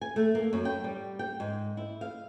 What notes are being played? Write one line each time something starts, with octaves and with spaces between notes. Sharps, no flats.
G#5
A3
A#3
F#2
G5
G3
G5
G#2
E4
F5